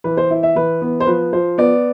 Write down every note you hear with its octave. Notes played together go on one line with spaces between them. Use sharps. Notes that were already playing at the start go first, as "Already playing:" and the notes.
E3 B4
C5
E4
E5
E3 B4
B3
C5
F3 B4
F3 C5
B3 D5